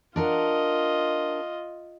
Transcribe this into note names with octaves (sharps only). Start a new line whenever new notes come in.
D4 F4 A#4 D#5 F#5